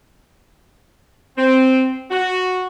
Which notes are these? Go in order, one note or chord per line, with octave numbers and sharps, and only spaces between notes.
C4
F#4